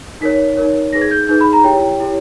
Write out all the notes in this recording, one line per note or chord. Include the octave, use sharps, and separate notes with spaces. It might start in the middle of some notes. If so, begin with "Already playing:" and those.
D#4 A#4 C#5 B6
D#4 A#4 C#5
D#4 G#4 B4 A#6
G#6
G6
D#4 G#4 B4 G6
B5
A#5
E4 G4 C#5 G5
E4 G4 C#5